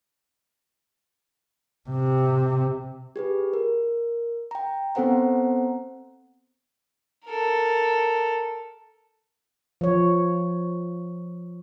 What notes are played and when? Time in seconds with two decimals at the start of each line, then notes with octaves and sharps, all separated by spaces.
1.90 C3
3.16 G4 G#4 B4
3.53 A#4
4.51 G5 A#5
4.95 B3 C4 A4 C5 F#5 A#5
7.26 A4 A#4
9.81 F3 C#5